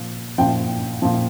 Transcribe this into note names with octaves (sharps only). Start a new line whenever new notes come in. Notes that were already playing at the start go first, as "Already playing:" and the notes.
Already playing: A#2 F3
A#2 F3 G5
A#2 F3